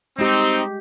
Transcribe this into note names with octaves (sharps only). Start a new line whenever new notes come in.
G#3 C4 D#4 G4